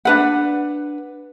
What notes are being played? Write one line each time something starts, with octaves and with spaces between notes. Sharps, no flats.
D4 B4 F#5